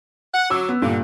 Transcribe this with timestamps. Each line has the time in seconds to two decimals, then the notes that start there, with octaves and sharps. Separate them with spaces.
0.34 F#5
0.50 F#3 D6 E6
0.69 B3
0.82 G2 A#2 D3